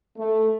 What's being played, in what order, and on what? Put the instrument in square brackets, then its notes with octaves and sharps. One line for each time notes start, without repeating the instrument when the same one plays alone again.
[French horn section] A3